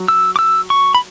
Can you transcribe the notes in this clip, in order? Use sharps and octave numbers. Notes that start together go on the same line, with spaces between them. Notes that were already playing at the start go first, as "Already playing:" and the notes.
Already playing: F#3
E6
D6
E6
C#6
B5